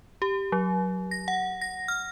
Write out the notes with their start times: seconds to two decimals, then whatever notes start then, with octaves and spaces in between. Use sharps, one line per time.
0.22 G4
0.52 F#3
1.11 A#6
1.28 F#5
1.61 A#6
1.88 F6